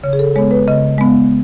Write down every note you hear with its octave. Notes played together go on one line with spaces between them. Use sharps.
C#3 C#5
G#4
A4
G#3 B3 C#5
B4
C#3 D#5
G#3 B3